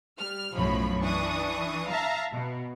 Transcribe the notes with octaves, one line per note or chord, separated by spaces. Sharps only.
G3 F6
B1 F#2 A2 F3 C#5 B5
E3 D4 C#6 D#6
E5 F5 A5 A#5
B2